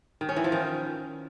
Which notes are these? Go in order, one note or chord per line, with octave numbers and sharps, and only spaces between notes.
D#3
C#4
E3
F3
D#3